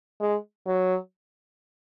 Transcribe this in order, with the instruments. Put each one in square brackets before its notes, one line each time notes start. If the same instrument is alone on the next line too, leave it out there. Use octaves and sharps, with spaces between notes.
[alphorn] G#3
F#3